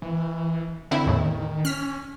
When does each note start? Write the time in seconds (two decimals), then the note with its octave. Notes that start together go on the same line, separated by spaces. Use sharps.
0.02 E3
0.91 D3 D#3 C4 E4
1.06 E2 A2 C#3
1.65 C#4 F6 B6